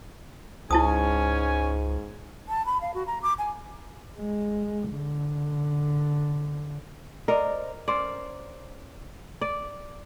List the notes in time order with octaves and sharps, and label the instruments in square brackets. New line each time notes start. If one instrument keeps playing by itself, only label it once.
[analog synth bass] C#2 [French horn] G#2 [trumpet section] C#4 G#5 [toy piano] E4 A5 D#6
[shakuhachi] A5
B5
F5
F#4
A#5
D6
G#5
[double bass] G#3
D3
[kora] A#4 [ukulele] C5 D5 D#5
[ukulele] C#4 A#4 C5 [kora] D5
[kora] D5